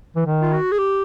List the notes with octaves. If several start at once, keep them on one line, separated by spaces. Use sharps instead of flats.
E3
D#3
F4
F#4
G#4
G4